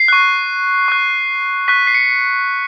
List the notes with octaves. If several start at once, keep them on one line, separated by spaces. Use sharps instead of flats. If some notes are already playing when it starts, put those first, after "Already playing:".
Already playing: C7
C#6 F#6
C#6 F#6
C#6 F#6 B6
C7
C#7